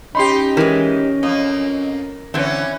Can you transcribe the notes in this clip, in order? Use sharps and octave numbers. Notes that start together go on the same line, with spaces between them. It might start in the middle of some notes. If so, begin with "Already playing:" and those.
C#4 D#4 G4 B5 C6 C7
E3 G#3 A#4
F2 A#3 D#5
D3 E3 C4 C#4